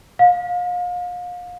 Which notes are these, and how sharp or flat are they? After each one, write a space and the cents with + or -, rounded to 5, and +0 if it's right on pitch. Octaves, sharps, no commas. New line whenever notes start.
F5 +35